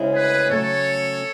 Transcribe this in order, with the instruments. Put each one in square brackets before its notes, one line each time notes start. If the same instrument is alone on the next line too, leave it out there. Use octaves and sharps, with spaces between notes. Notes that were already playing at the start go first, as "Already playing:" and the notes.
Already playing: [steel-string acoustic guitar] D2 C#3 G#3 C#4 E4
[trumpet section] G#4 B4
[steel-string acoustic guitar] C#3 F#3 A3 C#4 [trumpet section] A4 C#5